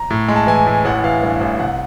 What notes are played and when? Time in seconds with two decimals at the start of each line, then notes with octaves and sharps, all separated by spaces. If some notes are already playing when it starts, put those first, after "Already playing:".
Already playing: A#5
0.10 A2
0.28 G#3
0.36 A5
0.47 E3 G#5
0.67 A2
0.85 A1 F#5
1.04 E3 F5
1.23 G2
1.41 A1
1.59 C2 F#5